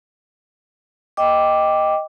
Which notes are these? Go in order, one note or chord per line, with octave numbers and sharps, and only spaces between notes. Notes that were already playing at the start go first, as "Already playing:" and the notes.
D#5 G5 D6